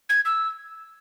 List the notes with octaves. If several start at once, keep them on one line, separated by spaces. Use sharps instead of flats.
G#6
E6